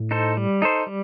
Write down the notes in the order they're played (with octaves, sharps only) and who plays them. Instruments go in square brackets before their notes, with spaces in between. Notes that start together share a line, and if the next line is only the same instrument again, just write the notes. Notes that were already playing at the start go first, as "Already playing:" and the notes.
Already playing: [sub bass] A2
[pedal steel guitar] D#4 A4 C5
G3
D#4 A4 C5
G3